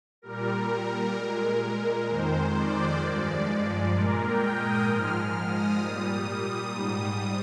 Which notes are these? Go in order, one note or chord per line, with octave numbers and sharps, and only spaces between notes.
A#2 G3 A#4
A#2 G#3
F2 D#3 G#3 C5
D5
G2 F3 G#3
A#2 G#3 A#4
G5
D#6
G#2 F3 G#3 F6
F6
D#6
A#2 G3 D#6
G#2 G3 D#6